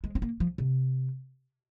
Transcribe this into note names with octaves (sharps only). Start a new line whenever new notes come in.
G#3
C4
A#3
F3
C3